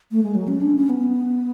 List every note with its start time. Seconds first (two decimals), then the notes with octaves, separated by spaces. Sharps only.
0.12 A3
0.23 G#3
0.35 F#3
0.48 C#4
0.61 D4
0.75 C#4
0.89 B3